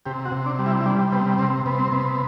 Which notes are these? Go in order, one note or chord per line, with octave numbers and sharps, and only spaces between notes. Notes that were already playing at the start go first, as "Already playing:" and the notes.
C3 G4
F#4
C3
D4
G3
E4
E4
G3 D4
C3 B3
C3 C4
C3 B3
C4
C3 B3